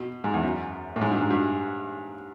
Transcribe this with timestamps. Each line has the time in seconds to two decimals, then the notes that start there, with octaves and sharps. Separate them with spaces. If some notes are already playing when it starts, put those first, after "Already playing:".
Already playing: B2
0.24 G#2
0.34 E2
0.43 F#2
0.96 A2
1.01 G#2
1.11 G2
1.21 G#2
1.30 G2